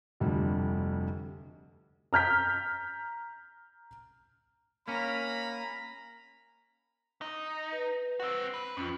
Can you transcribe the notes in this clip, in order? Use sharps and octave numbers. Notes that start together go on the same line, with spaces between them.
F1 D2 G3
A#5 F6 G6 B6
A#3 C#4 A#5 B5
D#4
B4
C4 F#4
B4
F2 C#4 F4